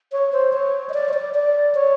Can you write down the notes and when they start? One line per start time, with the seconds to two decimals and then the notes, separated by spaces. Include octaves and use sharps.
0.12 C#5
0.33 C5
0.53 C#5
0.89 D#5
0.94 D5
1.09 C#5
1.14 D5
1.34 D5
1.75 C#5